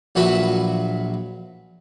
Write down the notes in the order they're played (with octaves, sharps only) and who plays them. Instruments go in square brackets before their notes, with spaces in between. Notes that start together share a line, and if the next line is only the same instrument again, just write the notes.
[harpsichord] A#1 F#3 F#4 B4 E5